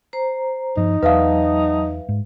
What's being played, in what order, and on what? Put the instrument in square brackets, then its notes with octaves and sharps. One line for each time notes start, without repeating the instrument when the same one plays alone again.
[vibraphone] C5 A#5
[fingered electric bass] G2 F3 [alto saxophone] D#4
[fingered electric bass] E2 [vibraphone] F#3 A5 D#6 [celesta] B4 E5 F5
[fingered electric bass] G#2